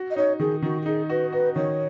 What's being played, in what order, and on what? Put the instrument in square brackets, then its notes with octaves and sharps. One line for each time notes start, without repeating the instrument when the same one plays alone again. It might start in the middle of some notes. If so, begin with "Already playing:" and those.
Already playing: [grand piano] F#4
[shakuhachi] D#5
[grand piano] D#4 [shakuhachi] C#5
[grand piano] D#3 [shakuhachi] G#4
[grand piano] D#3 [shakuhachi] F#4
[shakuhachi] F#4
[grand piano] D#4 [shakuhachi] G#4
[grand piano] F#4 [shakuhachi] B4
[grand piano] F#4 [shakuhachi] B4
[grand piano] D#3 [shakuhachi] C#5